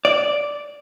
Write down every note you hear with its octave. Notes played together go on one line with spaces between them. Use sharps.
D5